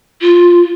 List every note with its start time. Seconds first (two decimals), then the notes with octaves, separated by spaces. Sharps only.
0.21 F4